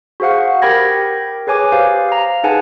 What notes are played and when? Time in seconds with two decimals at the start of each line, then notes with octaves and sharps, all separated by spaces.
0.20 F#4 G#4 C5 F5 F#5
0.62 G4 A#4 G5 B5 G#6 A#6
1.47 G#4 B4 C#5 G#5 D6
1.72 G4 C5 F5
2.09 F5 A#5
2.44 D#4 G#4 B4 F#5 G#5 A5